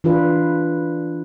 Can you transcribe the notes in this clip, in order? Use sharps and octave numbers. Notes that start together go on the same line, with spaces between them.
E3 D4 F4 B4